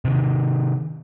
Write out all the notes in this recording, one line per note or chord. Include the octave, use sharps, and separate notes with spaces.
C3 D#3